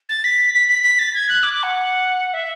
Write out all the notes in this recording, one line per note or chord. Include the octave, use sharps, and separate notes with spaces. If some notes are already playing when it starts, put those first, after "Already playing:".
A6
B6
B6
B6
B6
A6
G#6
F#6
D6
D6
F#5
E5